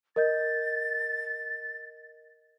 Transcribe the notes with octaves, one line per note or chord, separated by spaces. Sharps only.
A#4 D#5 G6 A6